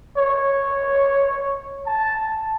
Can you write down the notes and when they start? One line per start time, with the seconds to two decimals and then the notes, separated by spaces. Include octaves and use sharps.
0.17 C#5
1.87 A5